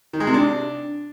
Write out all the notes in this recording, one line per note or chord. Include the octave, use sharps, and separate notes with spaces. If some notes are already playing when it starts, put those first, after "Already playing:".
D#3
G#3
C3
D4